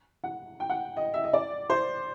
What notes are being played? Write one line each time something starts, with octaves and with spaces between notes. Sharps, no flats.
F#5
G5
F#5
D#5
E5
D#5
D5
C5